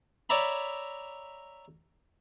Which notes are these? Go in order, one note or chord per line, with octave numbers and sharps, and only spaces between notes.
C#5 D5 E5 A#5 B5